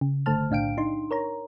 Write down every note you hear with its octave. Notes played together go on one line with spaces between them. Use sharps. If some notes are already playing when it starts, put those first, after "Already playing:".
C#3
G1 D3 A3 C5 A5 F6
B1 A2 D4 F5 G5 D7
D4 D#4 C6
A#4 C#5 A#5